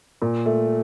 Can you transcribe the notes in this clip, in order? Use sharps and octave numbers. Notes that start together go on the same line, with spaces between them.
A#2
A3